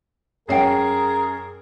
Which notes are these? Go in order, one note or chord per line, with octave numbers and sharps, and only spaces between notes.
F#2 G#4 A#4 C#5 G5 C7